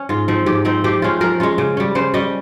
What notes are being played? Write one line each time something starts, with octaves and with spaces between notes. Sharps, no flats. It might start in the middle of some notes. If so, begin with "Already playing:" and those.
Already playing: C#4
G#2 F4
F3 C4 D#4
G#2 G4
F3 C4 D#4
F3 G4
G#3 C#4 F4
F3 A#4
G#3 C#4 F4
C#3
G3 C#4
C#3 C5
G3 C#4 D#5